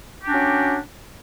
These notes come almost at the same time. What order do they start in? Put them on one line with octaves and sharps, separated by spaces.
G4 D4 F#4 C#4 F#3